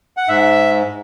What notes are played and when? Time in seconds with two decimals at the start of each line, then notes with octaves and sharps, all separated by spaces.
0.17 F#5
0.28 G#2 E5